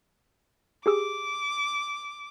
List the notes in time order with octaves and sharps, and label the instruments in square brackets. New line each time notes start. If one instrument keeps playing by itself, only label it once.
[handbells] G4 G#4 E6 [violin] D6